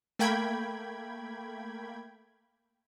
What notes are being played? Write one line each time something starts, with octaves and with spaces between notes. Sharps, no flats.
A3 A#3 G5 B5 G#6